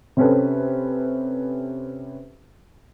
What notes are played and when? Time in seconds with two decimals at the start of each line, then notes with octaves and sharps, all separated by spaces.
0.17 C3 C4 C#4 A4 B4